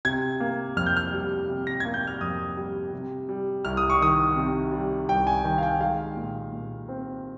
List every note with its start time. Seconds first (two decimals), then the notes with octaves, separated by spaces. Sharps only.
0.05 C3 G#6
0.40 A#3
0.76 F2 F6
0.86 G6
0.96 F6
1.13 G3
1.49 C3
1.67 A#6
1.80 A#3 G#6
1.94 G6
2.07 F6
2.21 F2 D#6
2.57 G3
2.93 C3
3.29 G3
3.65 C2 F6
3.77 D#6
3.90 C#6
4.01 D#3 D#6
4.36 C3
4.72 G3
5.08 C2 G5
5.27 G#5
5.44 D#3 G5
5.58 F5
5.63 G5
5.81 G#3 F5
6.17 A#2
6.53 A#2
6.89 C4